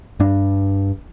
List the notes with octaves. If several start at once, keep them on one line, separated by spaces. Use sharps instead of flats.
G2 D4